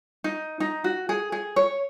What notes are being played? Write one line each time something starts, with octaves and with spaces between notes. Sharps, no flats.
D#4
D#4
F#4
G#4
G#4
C#5